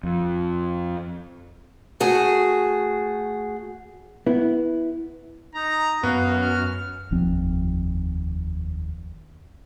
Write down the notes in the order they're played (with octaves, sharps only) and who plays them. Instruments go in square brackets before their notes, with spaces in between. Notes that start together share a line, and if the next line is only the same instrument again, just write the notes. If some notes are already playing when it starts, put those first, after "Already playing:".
[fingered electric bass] F2
[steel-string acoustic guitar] A3 F#4 G#4
[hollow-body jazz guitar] B3 E4
[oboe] D#4 [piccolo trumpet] A#5
[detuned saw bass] F#2 [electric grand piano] B3 [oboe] F#4 [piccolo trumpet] F5
[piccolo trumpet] F6
[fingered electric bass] F1 D#2 F3 C4